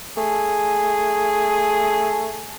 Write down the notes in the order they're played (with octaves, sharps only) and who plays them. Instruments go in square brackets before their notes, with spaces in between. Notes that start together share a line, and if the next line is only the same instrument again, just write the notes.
[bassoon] A3 [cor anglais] G#4